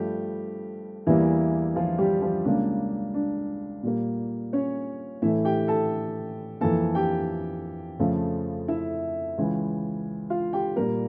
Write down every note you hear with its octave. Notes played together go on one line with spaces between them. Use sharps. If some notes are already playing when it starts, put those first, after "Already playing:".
Already playing: G2 F3 G3 A3 G4
E2 E3 G3 A#3 E4
F3 F4
G3 G4
F3 F4
C#2 C#3 G3 A#3 D4
D4
A#2 G3 A#3
C#4 C#5
A2 E3 A3 E4 E5
G4 G5
A4 A5
F2 E3 A#3 A4 A5
G4 G5
F2 C#3 F3 A3
E4 E5
C#2 C#3 E3
F4 F5
G4 G5
A#2 G3 A#3 A#4